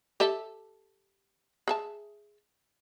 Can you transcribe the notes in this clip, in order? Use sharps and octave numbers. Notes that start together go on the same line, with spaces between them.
G4 A4 E5
G#4 E5 A5